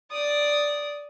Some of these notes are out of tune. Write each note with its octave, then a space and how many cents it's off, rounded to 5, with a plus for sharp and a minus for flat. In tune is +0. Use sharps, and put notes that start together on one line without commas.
D5 -5 D#6 -5